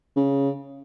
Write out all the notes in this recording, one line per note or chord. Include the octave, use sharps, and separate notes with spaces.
C#3